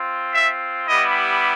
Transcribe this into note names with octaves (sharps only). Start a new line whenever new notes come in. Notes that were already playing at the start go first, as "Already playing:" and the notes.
Already playing: C4 F4
E5
G3 B3 E4 G4 D#5